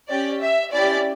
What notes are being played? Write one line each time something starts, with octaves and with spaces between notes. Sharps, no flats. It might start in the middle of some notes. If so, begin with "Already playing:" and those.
C#4 G4 D5
E5
C#4 E4 G4 D5